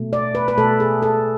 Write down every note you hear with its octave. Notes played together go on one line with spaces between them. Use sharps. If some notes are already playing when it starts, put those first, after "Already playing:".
Already playing: B2 A3
D5
B4
B4
B2 A3 A4
G#4
A4